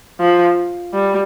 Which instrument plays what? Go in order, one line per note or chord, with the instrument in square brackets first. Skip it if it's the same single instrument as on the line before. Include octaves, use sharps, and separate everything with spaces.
[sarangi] F3
G3